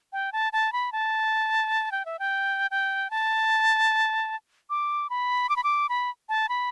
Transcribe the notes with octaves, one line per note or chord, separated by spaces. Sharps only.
G5
A5
A5
B5
A5
G5
E5
G5
G5
A5
D6
B5
D6
B5
D6
B5
A5
B5